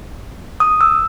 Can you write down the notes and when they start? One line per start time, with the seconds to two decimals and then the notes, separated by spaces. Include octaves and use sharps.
0.60 D#6
0.81 E6